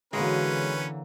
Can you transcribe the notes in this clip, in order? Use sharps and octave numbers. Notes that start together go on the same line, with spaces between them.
D3 E3 F#3 G#3 A#3 C#4 B4